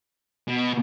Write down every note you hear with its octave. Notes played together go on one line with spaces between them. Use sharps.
B2